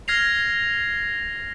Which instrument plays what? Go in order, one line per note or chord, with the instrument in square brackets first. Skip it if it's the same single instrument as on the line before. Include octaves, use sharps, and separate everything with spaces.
[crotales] F6 G#6 A#6 C7 F7